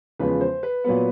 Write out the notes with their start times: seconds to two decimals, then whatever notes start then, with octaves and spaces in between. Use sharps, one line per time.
0.19 E2 C#3 F3 G#3 B3 B4
0.41 C5
0.63 B4
0.84 A#2 F#3 B3